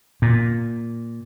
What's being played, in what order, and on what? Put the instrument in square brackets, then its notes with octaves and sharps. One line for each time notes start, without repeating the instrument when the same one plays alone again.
[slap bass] A#2